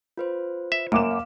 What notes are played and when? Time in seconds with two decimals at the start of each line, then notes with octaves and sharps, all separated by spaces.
0.17 F4 B4 C5
0.72 E5
0.92 F#2 A#3 D6 E7
1.11 F5